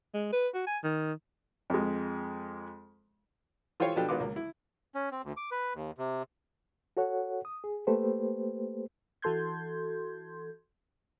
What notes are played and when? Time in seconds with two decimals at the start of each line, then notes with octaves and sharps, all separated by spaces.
0.14 G#3
0.33 B4
0.54 F#4
0.67 G#5
0.83 D#3
1.70 F2 G#3
3.80 E3 F4 G4 A4 C5 C#5
3.96 B2 F3 D4 G4 A4
4.09 G#1 D#3 B3 F4 F#4 D6
4.20 C#2 A#3
4.36 E4
4.95 C#4
5.12 C4
5.24 D2
5.37 D6
5.51 B4
5.74 D#2
5.98 C3
6.97 F#4 A4 C#5 F#5
7.45 D#6
7.64 G#4
7.87 A3 A#3 G4 A4 B4 C5
9.22 E3 F#4 A4 C6 G6 G#6